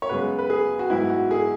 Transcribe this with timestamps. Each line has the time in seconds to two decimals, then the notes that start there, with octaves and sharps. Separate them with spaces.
0.02 C#5
0.09 F#2 C#3 G#3 B3 B4
0.38 B4
0.50 G#4
0.79 F#4
0.90 G#2 F#3 B3 E4
1.10 F#4
1.31 G#4